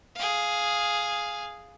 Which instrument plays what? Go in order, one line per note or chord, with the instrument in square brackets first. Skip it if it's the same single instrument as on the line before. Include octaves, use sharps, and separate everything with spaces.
[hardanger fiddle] G#4 F5